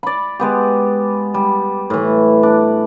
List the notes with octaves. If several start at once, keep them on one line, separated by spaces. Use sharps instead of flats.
D5 B5
G#3 B3 G4
G3
A2 E3
D4